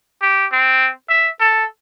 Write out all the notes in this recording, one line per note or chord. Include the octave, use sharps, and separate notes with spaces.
G4
C4
E5
A4